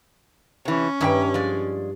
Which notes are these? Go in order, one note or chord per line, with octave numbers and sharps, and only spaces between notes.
C3 E3 C#4
G2 D#3 D4 E4 D5 G5
F3 G#3 D5